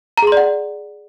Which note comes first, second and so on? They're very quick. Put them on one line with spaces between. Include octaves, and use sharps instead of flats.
A#5 G#4 C6 D5 F#5